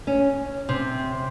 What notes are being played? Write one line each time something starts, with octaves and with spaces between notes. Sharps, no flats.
C#4
C3